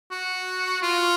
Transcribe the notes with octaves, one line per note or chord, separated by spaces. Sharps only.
F#4
F4